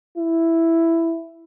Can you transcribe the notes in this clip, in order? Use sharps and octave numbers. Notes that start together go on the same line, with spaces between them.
E4